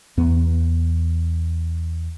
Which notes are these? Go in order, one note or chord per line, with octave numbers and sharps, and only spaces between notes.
E2 B3